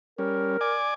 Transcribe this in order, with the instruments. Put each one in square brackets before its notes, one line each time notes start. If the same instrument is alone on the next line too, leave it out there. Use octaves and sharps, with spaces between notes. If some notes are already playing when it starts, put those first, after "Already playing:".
[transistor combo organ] G3 C#4 [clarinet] A#4
[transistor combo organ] D5 G#5 D6